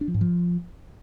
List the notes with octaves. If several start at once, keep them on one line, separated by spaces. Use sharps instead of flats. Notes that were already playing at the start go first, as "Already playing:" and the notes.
D4
F3
G#2
F3